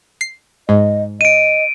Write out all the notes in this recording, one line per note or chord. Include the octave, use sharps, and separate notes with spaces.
C7
G#2 D#5
D#5 D7 D#7